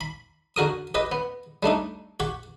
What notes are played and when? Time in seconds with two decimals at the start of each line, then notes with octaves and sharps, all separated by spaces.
0.01 B5
0.56 D3 F#4 A#4 D#6
0.95 G4 B4 D#5
1.12 B3
1.63 G3 A3 D4 D#4
2.20 G4 F#5 C#6